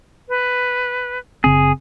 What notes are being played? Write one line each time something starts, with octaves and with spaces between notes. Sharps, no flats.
B4
F#1 C#3 C4 G#4